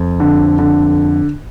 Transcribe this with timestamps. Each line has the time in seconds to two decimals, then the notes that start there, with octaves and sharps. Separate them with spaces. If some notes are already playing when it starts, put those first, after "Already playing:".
Already playing: F2
0.20 D3
0.59 D3